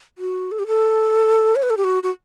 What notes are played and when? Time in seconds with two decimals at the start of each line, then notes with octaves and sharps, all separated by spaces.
0.18 F#4
0.51 A4
0.59 G4
0.67 A4
1.56 C#5
1.63 B4
1.70 A4
1.77 G4
1.84 F#4
2.03 F#4